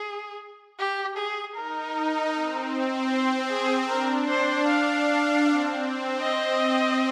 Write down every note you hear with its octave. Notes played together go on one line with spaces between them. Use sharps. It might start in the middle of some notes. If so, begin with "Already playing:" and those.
Already playing: G#4
G4
G#4
D#4 A#4
C4
C5
G#4
D4 A#4
C5
F5
C4
C4 D#5